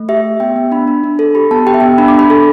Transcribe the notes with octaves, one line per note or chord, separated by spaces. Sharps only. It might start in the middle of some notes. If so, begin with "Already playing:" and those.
Already playing: A3
G4 E5
G4
B3 G5
B3
D4 B5
D4
D4
A4
G4 B5
B3 A5
G4 G5
E5
B3 G5
D4 B5
D6
D4
B5
A4